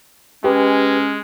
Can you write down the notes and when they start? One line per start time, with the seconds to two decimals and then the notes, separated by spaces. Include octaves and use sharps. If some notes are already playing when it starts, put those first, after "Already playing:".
0.44 G#3 C#4 G4 B4